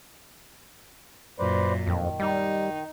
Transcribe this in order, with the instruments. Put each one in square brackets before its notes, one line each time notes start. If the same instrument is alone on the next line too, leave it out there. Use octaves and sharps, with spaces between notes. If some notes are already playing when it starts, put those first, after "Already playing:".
[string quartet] F#2 A#2 [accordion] B4 C5 D5
[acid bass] F2 [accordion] D#3
[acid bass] G3 [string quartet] D#4